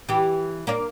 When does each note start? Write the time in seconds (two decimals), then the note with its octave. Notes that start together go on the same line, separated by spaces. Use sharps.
0.09 E3 G4
0.67 A#3 D4